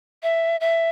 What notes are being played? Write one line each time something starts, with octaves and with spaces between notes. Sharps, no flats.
E5
E5